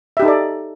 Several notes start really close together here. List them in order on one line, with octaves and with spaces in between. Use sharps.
E5 G4 D#4 A4 D5